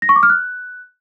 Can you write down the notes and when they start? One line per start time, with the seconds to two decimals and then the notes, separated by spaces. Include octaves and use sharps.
0.02 A#6
0.09 C#6
0.16 D6
0.23 F6
0.30 F#6